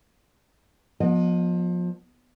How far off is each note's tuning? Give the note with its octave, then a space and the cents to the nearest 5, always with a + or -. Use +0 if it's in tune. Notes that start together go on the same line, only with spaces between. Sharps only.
F3 +25 B3 -30 D#5 -15